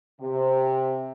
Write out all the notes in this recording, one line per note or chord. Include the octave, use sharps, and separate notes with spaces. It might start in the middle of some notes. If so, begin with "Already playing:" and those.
C3